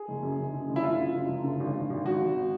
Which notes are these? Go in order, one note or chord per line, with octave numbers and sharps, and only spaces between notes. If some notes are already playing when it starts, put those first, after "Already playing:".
Already playing: G#4
F#1
F#2
F#2
D3
F#1
E4
F#1 F4
F#2
F#2
F#1
D3
G#1
G#1
G#1
G#1 F#4
G#1